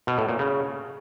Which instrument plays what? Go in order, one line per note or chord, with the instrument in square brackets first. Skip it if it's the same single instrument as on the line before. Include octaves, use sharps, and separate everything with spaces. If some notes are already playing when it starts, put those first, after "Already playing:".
[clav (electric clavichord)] B2
A2
A#2
C#3